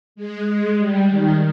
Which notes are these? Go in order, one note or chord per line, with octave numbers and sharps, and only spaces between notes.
G#3
G#3
G3
D#3